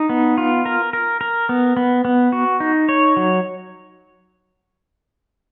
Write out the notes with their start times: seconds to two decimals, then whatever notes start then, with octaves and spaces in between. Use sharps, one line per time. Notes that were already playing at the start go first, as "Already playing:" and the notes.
Already playing: D#4
0.09 B3
0.38 F4
0.66 A#4
0.93 A#4
1.21 A#4
1.49 B3
1.77 B3
2.05 B3
2.32 F#4
2.60 D#4
2.89 C#5
3.17 F#3